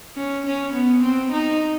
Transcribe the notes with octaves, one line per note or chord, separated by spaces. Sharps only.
C#4
C#4
B3
C4
D#4